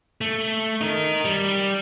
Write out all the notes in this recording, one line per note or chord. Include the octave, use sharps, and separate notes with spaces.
A3
D#4 A#4
G3